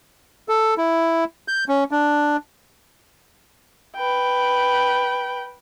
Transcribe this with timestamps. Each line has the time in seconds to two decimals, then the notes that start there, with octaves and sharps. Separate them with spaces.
0.49 A4
0.78 E4
1.48 G6
1.69 C#4
1.91 D4
3.96 B4 G5